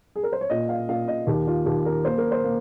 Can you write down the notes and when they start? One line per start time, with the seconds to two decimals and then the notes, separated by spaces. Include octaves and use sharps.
0.16 G#4
0.23 A#4
0.33 C5
0.41 C#5
0.50 A#2 D#5
0.69 F5
0.89 A#2 F5
1.08 D#5
1.27 D#2 G4
1.47 F4
1.66 D#2 G4
1.86 A#4
2.05 A#3 C5
2.18 A#4
2.32 C5
2.44 A#3